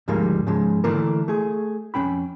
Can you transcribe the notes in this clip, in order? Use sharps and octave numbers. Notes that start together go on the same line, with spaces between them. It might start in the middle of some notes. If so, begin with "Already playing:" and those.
D2 G#2 F3 G3 G#3 A#3
G#2 C#3 F3 G#3
D3 E3 A3 A#3 D4 A#4
A3 G#4
F2 F#3 C#4 G5 B5